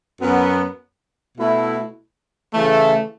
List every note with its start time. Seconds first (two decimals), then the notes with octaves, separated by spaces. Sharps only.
0.22 F#2 F#3 B3
1.38 B2 A3 E4
2.54 C#3 E3 A3